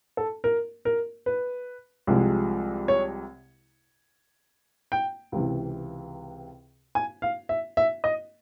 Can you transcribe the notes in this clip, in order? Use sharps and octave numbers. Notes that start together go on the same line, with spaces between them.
A4
A#4
A#4
B4
C2 C3 F3 G#3
C#5
G5
C#2 C3 E3
G#5
F5
E5
E5
D#5